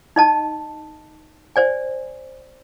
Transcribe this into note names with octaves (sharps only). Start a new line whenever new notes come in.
D#4 D#5 A5
C5 D5 G#5